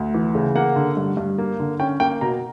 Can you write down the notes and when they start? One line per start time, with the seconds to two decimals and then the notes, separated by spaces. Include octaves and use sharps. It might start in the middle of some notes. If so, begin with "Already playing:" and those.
Already playing: D2
0.14 E3
0.35 C#3
0.55 A#3 F#5
0.76 D3
0.97 G2
1.17 G2
1.38 A#3
1.59 D3
1.80 C#4 G5
2.00 A#3 G5
2.21 B2 A#5